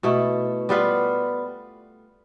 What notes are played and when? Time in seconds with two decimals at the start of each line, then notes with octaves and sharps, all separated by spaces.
0.03 B2 A3 E4
0.69 G3 B3 F4 B4